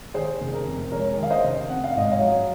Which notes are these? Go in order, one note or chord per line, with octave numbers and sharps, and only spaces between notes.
D#3 G#4 C5
F1
A#4
F2
G#3 A#4 C#5
D#3
F5
C5 D#5
F1
C4 F#5
F5
G#2 D#5
C#5 F5
F#3